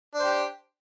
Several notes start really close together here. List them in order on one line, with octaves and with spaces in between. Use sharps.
D4 C5 G4